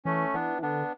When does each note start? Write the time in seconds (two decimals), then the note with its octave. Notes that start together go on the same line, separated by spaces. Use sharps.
0.05 E3 A3 C#4
0.34 E3 B3 D4
0.59 E3
0.62 D3 B3 D4